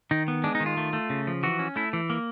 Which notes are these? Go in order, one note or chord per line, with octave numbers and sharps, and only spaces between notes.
D#3 D#4
B3
G#3 D4
D#4
D#3
F4
A3
A3
C#3
F3
E3 F#4
C#4
A3 E4
E3
A#3